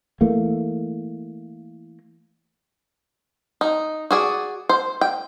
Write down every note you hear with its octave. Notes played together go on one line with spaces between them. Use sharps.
E3 A3 A#3
D#4
F#4 G#4 D5
C5
G5